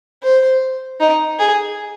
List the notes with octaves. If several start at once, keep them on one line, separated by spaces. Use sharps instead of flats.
C5
D#4
G#4